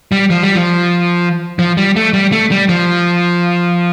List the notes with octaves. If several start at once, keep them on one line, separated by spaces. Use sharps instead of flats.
G3
F3
G3
F3
F3
G3
A3
G3
A3
G3
F3